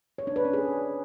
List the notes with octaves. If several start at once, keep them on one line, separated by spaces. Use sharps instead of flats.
C#5
D4
B4
C#4
G#4